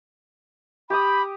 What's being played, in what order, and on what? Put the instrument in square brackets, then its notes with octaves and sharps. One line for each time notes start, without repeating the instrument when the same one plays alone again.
[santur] G4 D6 D#6 [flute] B5